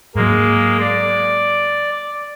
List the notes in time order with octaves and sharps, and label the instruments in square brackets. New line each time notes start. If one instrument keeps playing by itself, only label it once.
[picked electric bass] G#2 F#3 [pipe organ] G#3 A#3
[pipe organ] D5